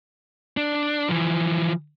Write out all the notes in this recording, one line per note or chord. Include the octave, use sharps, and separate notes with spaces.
D4
E3 F3